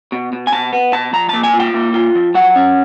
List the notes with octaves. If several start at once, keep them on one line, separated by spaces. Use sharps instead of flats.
B2
B2
G#5
B2 A5
B3
B2 A5
F3 A#5
A#3 A5
G#5
F4
G5
A#3
F4
F3
F#3 F#5
C#4